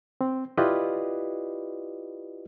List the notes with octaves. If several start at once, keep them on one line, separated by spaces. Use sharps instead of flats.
C4
E4 F4 G4 B4 D5 D#5